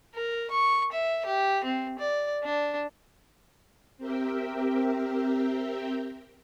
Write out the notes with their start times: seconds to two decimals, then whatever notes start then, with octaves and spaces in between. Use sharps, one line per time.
0.14 A#4
0.51 C#6
0.92 E5
1.26 G4
1.64 C4
1.99 D5
2.43 D4
3.98 C4 G4 A#4 E5 G5